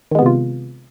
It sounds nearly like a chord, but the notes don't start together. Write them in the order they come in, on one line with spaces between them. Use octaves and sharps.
D#3 G#3 B3 C3 F4